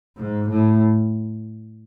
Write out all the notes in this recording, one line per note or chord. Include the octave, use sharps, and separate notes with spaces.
G#2
A2